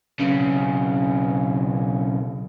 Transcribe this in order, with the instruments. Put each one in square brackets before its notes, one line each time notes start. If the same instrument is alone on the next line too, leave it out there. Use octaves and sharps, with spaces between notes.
[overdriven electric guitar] B1 C#3